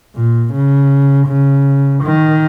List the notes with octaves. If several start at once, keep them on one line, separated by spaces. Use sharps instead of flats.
A#2
C#3
C#3
D#3